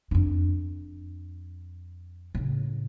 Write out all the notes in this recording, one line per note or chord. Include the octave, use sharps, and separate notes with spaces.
F2 D4
A2 C#3